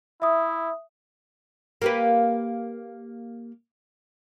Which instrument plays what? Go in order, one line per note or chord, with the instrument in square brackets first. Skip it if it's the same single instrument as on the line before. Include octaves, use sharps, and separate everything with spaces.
[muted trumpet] E4 [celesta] E5 D#6
[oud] A#3 G4 B4